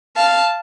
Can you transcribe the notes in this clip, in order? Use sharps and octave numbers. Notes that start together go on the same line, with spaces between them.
F5 A5